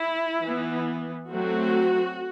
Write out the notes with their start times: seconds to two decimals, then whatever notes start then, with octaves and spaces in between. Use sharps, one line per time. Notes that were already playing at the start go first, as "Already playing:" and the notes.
Already playing: E4
0.42 E3 B3
1.29 F#3 A3 C4 F#4